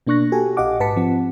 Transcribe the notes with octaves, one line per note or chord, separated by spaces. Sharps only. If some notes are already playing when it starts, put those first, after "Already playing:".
B2 A#3 D4 C#6 F#6 A#6
F#4 G4 A4 G#5
A#1 G4 D#5 F5 F#5 D6
G#2 B4 A5 B6 C#7
F3 C4 F#5